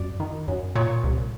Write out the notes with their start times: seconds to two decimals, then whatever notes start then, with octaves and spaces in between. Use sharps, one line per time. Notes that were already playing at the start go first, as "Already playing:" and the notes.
Already playing: F#2 D5
0.20 D#3
0.48 F#2
0.75 A#2 C#5
1.03 C2